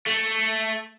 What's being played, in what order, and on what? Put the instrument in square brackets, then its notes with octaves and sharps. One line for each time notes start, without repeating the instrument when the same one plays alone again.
[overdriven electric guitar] A3